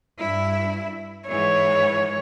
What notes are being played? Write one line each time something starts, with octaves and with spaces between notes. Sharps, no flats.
G2 E4
G#2 E3 C#5